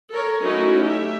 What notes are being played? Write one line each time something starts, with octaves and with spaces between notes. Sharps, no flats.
A4 A#4 C#5
F#3 A3 C#4 D#4 E4 F#4
G4 E5